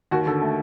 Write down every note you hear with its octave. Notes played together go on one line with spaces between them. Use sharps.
D#2 F#4
D3 A4
A3